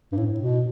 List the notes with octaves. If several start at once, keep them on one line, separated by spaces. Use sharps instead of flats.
G2
A2
B2